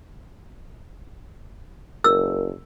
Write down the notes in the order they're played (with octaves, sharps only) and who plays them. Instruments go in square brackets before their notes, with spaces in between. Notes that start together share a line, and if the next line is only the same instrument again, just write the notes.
[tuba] F#1 [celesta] A#4 [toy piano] E6